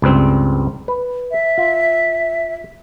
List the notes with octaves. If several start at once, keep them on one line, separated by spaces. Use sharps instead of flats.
C#2 G2 C4
B4
E5
F4